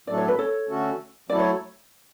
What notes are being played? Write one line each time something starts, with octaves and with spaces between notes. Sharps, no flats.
A2 F#3 A3 D4 A4 D5
C#5
B4
A4 C#5
D3 A3 C#4 F#4 A4
F#3 A3 E4 A4 D5
C#5